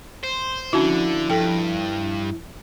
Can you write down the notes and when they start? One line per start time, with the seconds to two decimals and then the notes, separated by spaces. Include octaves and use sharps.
0.23 C5
0.73 D3 F3 C#4 D4 E4 F#4
1.30 G2 A4 G5